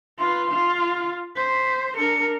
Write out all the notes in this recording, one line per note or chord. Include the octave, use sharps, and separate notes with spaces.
F4 B4 C6
F4 F5
C5 B6
D4 A#4 C#7